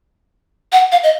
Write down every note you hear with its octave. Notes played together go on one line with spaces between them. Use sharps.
F#5
F5
D#5